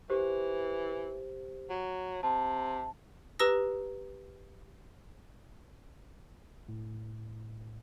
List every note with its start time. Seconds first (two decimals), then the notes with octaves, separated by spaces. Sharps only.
0.10 E3 G4 C5
1.70 F#3
2.23 C3 A5
3.39 G4 B4 A#5 D#6 E6 A#6
6.69 A2